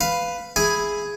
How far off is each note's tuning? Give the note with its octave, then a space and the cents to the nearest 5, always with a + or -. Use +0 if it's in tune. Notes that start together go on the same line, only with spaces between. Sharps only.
B4 +5 F5 +0
E4 +0 G#4 +0 G#5 +0